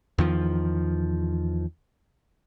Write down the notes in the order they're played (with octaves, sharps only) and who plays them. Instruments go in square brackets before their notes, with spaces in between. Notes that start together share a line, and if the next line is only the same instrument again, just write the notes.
[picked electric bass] E2 D#3 F3